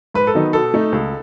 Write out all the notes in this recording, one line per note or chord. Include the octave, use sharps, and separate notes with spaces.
G#2 B4
A4
D#3 F#3 B3 D#4
B2 A4
A3 D#4
C#2